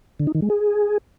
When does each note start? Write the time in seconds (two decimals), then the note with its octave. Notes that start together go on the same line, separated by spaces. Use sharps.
0.20 D3
0.27 D#4
0.35 D#3
0.42 G#3
0.50 G#4